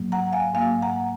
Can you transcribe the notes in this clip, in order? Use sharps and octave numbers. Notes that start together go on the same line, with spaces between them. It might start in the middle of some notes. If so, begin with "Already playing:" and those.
Already playing: G#2 F#3 A#3
F#5 A#5
F5 G#5
G#2 F#3 A#3 F5 G#5
F#5 A#5